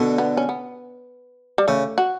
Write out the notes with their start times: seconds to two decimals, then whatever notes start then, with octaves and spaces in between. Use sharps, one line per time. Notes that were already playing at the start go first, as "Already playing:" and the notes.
Already playing: B2 D3
0.18 B3
0.37 C#4
0.49 B3
1.58 G3
1.68 C#3 A3
1.98 F#4